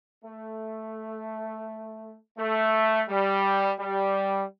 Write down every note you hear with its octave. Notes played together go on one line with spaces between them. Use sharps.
A3
A3
G3
G3